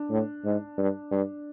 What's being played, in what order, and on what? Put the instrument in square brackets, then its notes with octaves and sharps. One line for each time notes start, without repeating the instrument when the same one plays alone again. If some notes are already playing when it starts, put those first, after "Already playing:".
Already playing: [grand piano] D4
[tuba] A2
G#2
G2
G2